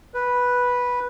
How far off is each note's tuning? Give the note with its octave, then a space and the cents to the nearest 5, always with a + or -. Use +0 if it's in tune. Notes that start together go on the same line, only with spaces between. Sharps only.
B4 -5